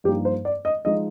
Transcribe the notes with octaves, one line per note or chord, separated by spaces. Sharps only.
G2 F3 A#3 D#4 G4
C5
D5
D#5
F3 G#3 D#4 D#5